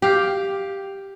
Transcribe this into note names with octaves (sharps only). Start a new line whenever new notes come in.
G4 F5